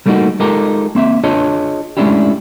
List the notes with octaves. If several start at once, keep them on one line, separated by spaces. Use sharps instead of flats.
G3 A3 A#3 C#4 D#4 F#4
G#3 D#4 F4 G4 A4 A#4
A#3 C4 E5
D4 F4 G#4 C#5 D#5
G#3 A3 C#4 D4 E4 G4